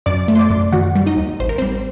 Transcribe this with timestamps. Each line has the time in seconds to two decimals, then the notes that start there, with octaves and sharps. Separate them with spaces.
0.06 F#2 D5 D6
0.28 A3
0.35 C6
0.39 D5 D6
0.50 F#2
0.72 D#3 F#4 F#5
0.95 G3
1.06 D#4 D#5
1.17 D#2
1.40 A1 C5
1.49 A#4
1.58 G3 C4 C5